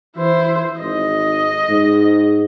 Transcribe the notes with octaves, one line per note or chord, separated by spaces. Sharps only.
E3 E4 C5
G#1 D#5
G#2